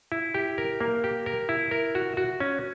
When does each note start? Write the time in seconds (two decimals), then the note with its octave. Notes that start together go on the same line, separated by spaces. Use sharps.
0.12 E4
0.34 G4
0.58 A#4
0.81 A#3
1.04 G4
1.26 A#4
1.49 E4
1.71 A#4
1.95 F#4
2.17 F#4
2.40 C#4